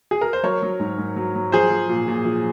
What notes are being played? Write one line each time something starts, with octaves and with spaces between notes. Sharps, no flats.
G#4
A#4
C5
F#3 A#4 C#5
F#3
G#2
G#2
F#3
F#3
F3 G#4 C5
F3
A#2
A#2
F3